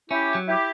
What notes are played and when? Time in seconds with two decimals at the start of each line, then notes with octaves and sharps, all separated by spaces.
0.10 C#4 E4 G4
0.35 F#3
0.47 E4 G4